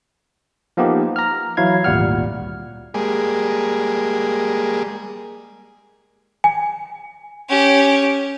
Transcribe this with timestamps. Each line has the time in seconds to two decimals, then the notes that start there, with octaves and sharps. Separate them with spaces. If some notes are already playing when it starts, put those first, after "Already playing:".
0.77 F3 A#3 B3 D#4 G4
1.16 A#5 F6
1.57 E3 F#3 E4 F5 G#6
1.84 G#1 D2 A#2 G3 F#5 F6
2.94 G3 G#3 A#3 G#4
6.44 G#5
7.49 C#4 G4